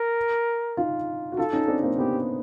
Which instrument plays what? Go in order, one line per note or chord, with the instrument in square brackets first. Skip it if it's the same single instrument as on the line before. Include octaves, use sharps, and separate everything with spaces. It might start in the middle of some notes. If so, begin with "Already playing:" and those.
Already playing: [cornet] A#4
[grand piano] D#4 F4
F#4
[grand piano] D#4 F4 [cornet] A4
[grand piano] C#4 D#4
C4 D4
A#3 C4
[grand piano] B3 [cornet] G4